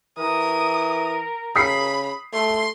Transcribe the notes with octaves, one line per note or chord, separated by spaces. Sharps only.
E3 A#4 D#6
C#3 B5 D#6 B6 C7
A3 C6